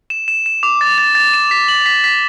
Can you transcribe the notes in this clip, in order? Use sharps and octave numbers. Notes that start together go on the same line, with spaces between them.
E7
E7
E7
D6
A6
A6
A6
E7
B6
F#7
B6
B6